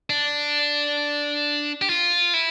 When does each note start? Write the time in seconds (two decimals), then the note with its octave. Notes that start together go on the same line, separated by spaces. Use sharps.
0.10 D4
1.82 G4
1.90 F4
2.34 E4